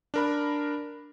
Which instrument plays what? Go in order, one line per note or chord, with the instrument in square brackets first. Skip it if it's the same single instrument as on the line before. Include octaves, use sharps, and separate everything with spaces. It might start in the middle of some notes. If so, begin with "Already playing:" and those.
[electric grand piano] D4 A#4 B5